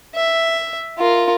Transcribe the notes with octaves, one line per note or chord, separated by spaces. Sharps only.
E5
F4 A#4